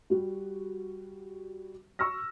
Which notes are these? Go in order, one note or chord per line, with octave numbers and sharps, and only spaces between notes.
G3 F#4 G4
C#6 E6 F6 A#6